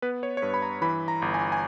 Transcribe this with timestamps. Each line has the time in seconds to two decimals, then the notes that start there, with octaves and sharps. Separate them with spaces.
0.02 B3 B4
0.23 C#5
0.37 C#5
0.42 G2 B4
0.54 B5
0.62 A#5
0.82 E3 B5
1.08 A#5
1.22 G1
1.34 G#5
1.52 G#5